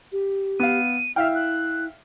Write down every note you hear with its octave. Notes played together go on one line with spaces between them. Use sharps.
G4
B3 F5 D#7
E4 E5 F5 G5 F6
F#6